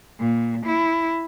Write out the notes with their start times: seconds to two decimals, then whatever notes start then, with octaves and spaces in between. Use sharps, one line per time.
0.20 A#2
0.66 E4